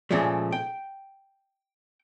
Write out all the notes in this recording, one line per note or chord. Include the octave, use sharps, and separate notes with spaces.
A#2 C#3 F3 G#3 A3
G5